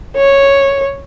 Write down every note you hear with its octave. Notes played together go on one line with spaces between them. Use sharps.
C#5